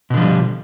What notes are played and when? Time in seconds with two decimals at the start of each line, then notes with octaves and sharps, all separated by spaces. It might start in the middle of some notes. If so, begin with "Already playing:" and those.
0.10 B2
0.14 D3
0.17 F3
0.21 G3